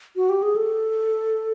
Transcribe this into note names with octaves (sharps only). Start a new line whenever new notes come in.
F#4
G4
G#4
A4